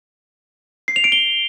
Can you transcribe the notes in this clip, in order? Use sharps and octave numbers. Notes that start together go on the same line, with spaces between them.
C7
F7
D7
G7